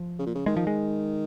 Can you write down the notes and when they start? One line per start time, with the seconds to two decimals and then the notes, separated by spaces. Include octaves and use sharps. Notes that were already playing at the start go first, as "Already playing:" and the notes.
Already playing: F3
0.19 C#3
0.26 A#2
0.35 C#3
0.46 D#3 G#3
0.57 F3
0.67 G#3